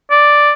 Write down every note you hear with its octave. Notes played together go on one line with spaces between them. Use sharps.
D5